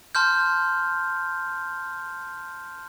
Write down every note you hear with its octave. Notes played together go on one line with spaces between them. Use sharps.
A5 C6 F6 G6